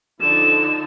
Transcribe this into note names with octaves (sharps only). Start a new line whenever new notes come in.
D3 F3 D#4 E7